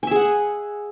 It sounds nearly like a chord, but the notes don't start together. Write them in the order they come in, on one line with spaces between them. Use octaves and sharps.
G#5 E5 G#4 F#5